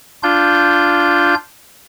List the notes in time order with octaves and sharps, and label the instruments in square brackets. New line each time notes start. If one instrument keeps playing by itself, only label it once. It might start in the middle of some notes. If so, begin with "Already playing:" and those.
[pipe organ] D4 F4 G6